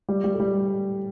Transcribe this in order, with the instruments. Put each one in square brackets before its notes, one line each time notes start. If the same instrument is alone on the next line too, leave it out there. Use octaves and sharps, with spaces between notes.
[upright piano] G3
G3
A3
G3